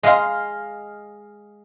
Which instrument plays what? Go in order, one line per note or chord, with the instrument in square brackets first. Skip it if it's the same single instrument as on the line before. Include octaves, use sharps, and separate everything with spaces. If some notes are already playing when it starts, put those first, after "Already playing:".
[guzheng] G#3 A#5 [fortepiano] D#5 F5